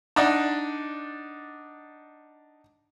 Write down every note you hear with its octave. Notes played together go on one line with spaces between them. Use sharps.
D4 D#4 D5 D#5 F#5